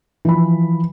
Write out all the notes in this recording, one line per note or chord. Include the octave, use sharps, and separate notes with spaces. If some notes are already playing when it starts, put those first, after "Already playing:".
E3 F3 B5